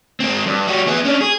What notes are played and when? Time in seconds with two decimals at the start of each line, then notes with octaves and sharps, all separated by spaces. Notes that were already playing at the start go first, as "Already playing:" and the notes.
0.20 G#2 C4
0.46 G2
0.67 G3 F#4
0.87 B3 G#4
1.05 C#4 D4
1.21 G#4